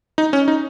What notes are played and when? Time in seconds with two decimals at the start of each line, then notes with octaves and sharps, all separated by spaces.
0.18 D#4
0.33 C#4
0.48 D#4